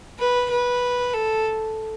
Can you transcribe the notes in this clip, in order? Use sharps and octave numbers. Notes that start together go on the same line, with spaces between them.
B4
B4
A4